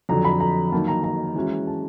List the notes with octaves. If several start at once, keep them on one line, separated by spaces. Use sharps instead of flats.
F2 D3 F#3 A#5
B5
A#5
D#3 F#3 A#3 A5
A#5
A#5
E3 G#3 C#4 F#4
A5